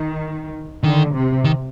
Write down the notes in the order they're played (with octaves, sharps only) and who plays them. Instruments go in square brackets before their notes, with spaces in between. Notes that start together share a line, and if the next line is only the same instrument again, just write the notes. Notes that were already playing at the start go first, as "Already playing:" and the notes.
Already playing: [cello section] D#3
[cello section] D3 [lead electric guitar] D#3
[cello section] C3
[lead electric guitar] D#3